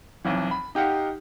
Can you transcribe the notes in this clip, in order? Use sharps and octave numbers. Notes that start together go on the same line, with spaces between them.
B1 F2 E3
B5
D#4 G4 F5 F#5